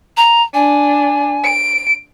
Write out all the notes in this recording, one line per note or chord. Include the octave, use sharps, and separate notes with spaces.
A#5
D4 G#5
D7